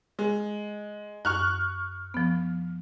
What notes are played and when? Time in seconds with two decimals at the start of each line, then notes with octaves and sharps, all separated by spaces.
0.19 G#3
1.25 F#2 C#6 F6 F#6
2.14 F3 B3